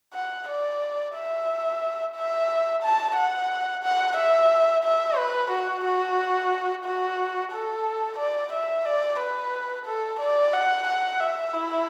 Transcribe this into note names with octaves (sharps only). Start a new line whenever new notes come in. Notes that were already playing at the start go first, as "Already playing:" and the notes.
F#5
D5
E5
E5
A5
F#5
F#5
E5
E5
B4
F#4
F#4
F#4
A4
D5
E5
D5
B4
A4
D5
F#5
F#5
E5
E4